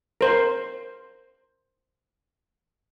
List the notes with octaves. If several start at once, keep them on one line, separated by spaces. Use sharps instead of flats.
A#4 C5